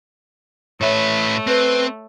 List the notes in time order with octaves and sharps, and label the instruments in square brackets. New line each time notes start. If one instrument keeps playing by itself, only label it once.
[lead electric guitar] A2 B4 [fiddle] A3 [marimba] C#5 E5
[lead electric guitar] C4 [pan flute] B4